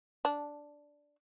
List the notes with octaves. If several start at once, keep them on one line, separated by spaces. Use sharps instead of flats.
D4